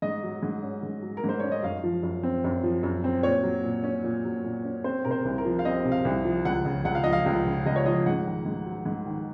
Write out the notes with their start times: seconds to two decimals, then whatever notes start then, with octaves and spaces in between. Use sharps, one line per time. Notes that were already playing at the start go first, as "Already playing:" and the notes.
0.02 G#2 D#5
0.23 F#3
0.43 G#2
0.63 C#4
0.83 G#2
1.02 F#3
1.17 A#4
1.24 G#2
1.29 C5
1.40 C#4 C#5
1.52 D#5
1.63 F#2 F5
1.83 F3
2.03 F#2
2.23 C4
2.44 F#2
2.63 F3
2.83 F#2
3.04 C4
3.23 A#2 C#5
3.43 F#3
3.63 A#2
3.84 C#4
4.04 A#2
4.25 F#3
4.44 A#2
4.64 C#4
4.84 C4 C5
5.05 C3 A#4
5.11 C5
5.25 C2
5.38 A#4
5.45 F3
5.59 F5
5.65 C4 D#5
5.85 C3
5.92 F5
6.05 C2
6.25 F3
6.45 C#2 F#5
6.65 C#3
6.85 C#2 F#5
6.95 F5
7.04 F3 D#5
7.13 F5
7.26 C#2
7.46 C#3
7.66 C#2 D#5
7.76 C#5
7.86 F3 D#5
8.06 G#2 F#5
8.26 D#3
8.46 G#2
8.66 F#3
8.86 G#2
9.06 D#3